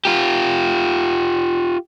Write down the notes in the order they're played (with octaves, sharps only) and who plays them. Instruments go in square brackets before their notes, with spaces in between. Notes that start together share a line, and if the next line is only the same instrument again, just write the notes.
[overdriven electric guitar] F4 G4